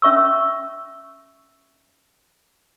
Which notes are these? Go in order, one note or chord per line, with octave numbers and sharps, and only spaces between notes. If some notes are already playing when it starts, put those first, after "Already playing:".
C#4 E5 C#6 E6